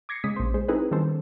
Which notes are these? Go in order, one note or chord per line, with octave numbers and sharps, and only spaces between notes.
D6 G#6 A#6 C7 C#7
C#3 G#3 D#6 B6
A#1 C5
G#3 G#4 C5
C4 D#4 E4 G#4 A4 B4
D#3 G3 B3 C#4 A4 C5